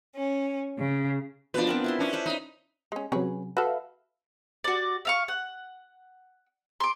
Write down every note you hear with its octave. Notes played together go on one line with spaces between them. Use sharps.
C#4
C#3
B2 F3 D4 B4
B3 C4 A#4
E4 E5 C6
C#4 D4
B4 C5 E5
D#4 D#5 B5
G#3 C#4
C3 F#3 C#4 G#4 B4
F#4 A4 B4 E5 F5
F#4 D5
E5 F5 C#6
F#5
C6 D6